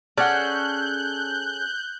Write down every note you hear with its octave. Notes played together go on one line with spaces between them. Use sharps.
C#4 G#4 A4 D5 F#5 F#6 G6